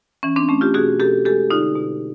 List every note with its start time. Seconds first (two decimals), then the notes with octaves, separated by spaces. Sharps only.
0.23 E3 C#4
0.36 C4 D4
0.49 A3 C#4
0.61 F4 G4
0.74 B2 F#4 G#4
1.00 B2 G4 A4
1.25 G#3 G4 A4
1.51 D3 D#4 F4
1.76 B2